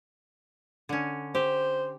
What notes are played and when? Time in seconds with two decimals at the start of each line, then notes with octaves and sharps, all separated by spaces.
0.89 D3 C#4
1.35 G4 C5